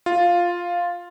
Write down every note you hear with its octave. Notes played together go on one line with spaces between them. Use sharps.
F4